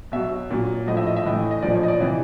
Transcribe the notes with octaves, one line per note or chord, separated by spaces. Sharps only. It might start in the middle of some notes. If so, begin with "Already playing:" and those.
B2 F#3 E5
A#2 F#3
A2 F3 D#5
E5
D#5
E5
A2 E3 D#5
D#5
A#2 F3 D5
C#5
D#5
D5
C3 E3